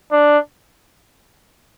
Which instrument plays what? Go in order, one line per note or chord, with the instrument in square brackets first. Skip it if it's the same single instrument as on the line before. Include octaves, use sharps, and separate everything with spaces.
[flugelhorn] D4